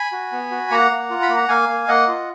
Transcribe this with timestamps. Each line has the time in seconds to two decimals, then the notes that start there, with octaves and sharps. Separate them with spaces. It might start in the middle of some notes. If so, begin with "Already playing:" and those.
Already playing: G#5 B5
0.12 F#4
0.32 B3
0.51 F#4
0.71 A#3 F#5 A#5
0.91 A#3
1.10 F4
1.22 B5
1.29 A#3
1.37 A#5
1.49 A#3 F5 G#5
1.69 A#3
1.88 A#3 D#5 F#5
2.08 F4